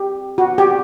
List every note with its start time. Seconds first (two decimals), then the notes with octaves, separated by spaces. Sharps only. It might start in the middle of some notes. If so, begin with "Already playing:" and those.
Already playing: G4
0.38 F#4
0.58 G4